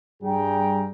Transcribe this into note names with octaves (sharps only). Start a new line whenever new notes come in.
G2 G3 G#4 G5 A#5